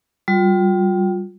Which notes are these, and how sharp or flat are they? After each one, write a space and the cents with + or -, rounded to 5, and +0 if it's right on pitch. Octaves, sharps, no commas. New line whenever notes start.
G3 -20 F4 +30